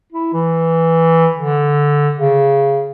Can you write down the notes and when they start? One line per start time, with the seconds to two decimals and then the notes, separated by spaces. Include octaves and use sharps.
0.12 E4
0.33 E3
1.36 D3
2.17 C#3